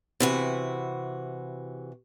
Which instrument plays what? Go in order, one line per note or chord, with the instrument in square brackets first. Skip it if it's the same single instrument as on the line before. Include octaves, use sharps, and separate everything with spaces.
[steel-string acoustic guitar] C3 E3 F#4